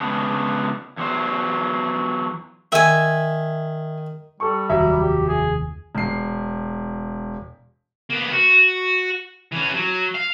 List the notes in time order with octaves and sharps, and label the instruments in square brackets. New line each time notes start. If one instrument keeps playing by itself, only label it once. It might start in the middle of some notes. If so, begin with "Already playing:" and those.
[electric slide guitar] C#3 G#3 B3 D4
E2 F#3 C5
[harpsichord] D#3 [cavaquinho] E5 G#5
[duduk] G3 [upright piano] A4 C#6
[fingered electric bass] F1 D#2 [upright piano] F#3 E5
[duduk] G4
G#4
[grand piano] E1 C7
[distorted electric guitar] A#3 B3
F#4
E3 C#4
F#3
F5